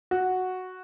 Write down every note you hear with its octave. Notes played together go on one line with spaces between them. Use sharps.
F#4